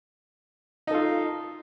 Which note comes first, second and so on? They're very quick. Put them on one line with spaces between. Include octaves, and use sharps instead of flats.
D#4 A4 F4